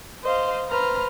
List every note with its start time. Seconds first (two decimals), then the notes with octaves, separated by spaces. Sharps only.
0.24 C5 D#5 F5
0.69 B4 C5 A#5 F6